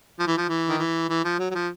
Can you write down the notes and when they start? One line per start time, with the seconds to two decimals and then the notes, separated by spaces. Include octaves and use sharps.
0.19 F3
0.27 E3
0.37 F3
0.49 E3
0.69 D#3
0.79 E3
1.09 E3
1.25 F3
1.39 F#3
1.51 F#3
1.55 F3